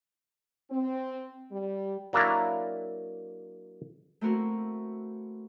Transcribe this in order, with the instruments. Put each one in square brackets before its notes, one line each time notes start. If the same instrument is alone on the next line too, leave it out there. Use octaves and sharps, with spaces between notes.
[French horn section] C4
G3
[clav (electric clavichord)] F#3 A#3 D4 E4 A#5
[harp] A3 A#3 C4 E4 F#4 A#4